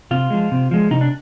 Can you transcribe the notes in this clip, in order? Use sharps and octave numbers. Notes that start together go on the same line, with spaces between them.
C3 F4
F3 G#3
C3
F3 G#3
C3 D#4
D4